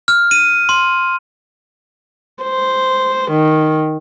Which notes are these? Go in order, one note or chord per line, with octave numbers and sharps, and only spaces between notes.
F6
D#7
C6
C5
D#3